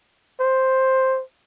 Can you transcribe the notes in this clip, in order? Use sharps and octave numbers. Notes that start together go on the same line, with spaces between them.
C5